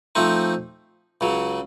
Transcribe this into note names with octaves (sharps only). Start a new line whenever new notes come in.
F3 A3 C4 D#4
C#2 C#3 F#3